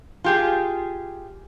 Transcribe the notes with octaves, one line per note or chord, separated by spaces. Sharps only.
F4 G4 G#4